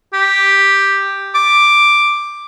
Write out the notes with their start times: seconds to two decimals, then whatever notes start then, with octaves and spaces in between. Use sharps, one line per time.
0.13 G4
1.35 D6